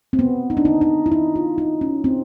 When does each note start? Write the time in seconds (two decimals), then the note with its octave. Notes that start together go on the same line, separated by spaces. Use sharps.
0.13 C4
0.19 B3
0.50 D#4
0.57 D4
0.65 D#4
0.81 D#4
1.06 E4
1.12 D#4
1.36 F4
1.58 D#4
1.81 C#4
2.04 C4